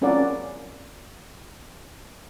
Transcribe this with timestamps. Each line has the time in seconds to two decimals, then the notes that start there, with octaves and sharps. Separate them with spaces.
0.01 C4 C#4 F4 A#4 D5 F#5